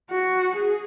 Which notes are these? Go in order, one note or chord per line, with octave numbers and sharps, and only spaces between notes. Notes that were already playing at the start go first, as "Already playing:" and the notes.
F#4
G#4